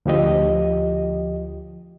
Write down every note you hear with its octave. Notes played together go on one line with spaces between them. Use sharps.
D2 F3 G4 D#5